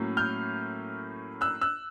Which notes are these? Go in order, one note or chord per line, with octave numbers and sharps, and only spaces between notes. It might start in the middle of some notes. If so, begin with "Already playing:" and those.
Already playing: A2 F#3 A#3 C#4
F6 G6
E6 F#6
E6 F#6